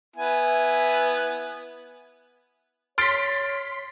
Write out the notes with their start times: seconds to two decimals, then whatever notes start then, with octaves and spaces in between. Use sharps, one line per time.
0.16 B3 E4 G#5
2.98 C#5 C6 F6 A6 B6 D7